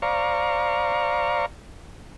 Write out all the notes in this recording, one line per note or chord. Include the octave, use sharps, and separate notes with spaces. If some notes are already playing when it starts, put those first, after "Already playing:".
C5 D5 F5 A#5 C#6